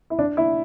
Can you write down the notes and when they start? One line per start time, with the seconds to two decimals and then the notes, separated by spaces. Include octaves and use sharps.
0.10 E4
0.19 D4
0.37 E4